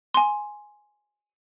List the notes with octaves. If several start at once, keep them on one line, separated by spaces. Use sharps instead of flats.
G#5 C6